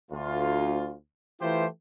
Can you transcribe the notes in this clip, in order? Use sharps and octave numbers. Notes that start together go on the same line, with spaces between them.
D2 F4
E3 A3 E4 F4 G4 C5